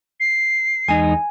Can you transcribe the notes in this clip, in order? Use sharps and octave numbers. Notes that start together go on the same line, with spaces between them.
C7
E2 G#3 D#4 G#5